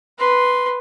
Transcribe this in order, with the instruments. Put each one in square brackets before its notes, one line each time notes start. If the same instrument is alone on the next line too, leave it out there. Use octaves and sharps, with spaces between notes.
[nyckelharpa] B4 C6